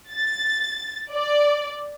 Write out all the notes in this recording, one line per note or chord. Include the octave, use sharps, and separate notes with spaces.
A6
D5